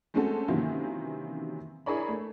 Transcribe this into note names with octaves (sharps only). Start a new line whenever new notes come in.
G#3 A3 C4 C#4 F#4 A4
C3 D#3 E3 F#3 A#3 C#4
D4 E4 G#4 A#4 C#5 B5
A3